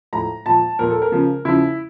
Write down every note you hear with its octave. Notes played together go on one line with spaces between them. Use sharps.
A2 F3 A#5
A#2 F3 A5
A#2 F3 A#4
A4
A#4
C#3 F3
C#3 F3 E4